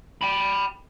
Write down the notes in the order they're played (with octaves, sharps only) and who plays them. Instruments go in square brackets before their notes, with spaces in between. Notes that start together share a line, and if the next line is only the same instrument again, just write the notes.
[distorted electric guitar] G5 B5